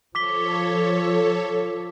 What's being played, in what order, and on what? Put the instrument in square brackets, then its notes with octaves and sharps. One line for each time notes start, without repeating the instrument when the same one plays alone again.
[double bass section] F3 [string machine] A4 C#5 [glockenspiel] D6 B6 G7